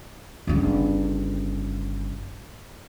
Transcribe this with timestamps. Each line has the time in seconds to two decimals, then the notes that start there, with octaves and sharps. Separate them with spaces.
0.47 G1 C#3